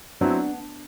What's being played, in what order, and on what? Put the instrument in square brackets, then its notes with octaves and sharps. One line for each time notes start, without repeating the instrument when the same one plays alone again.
[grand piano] F#3 C4 E4 [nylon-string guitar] B3 D4